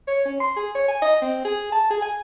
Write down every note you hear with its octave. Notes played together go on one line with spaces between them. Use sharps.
C#5
C#4
C6
G#4
C#5
G#5
D#5
C4
G#4
A5
G#4
G#5